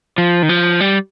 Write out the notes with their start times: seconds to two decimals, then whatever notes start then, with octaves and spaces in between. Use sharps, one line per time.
0.18 F3
0.43 D#3
0.49 F3
0.80 G3